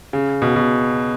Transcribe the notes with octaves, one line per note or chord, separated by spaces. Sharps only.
C#3
B2
B2